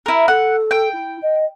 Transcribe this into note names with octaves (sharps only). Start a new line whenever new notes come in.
E4 A#4
A4 F#5
G5
E4
D#5